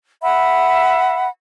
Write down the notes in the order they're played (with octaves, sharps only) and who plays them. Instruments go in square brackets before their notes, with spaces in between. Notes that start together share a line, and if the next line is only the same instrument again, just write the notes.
[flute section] E5 F#5 B5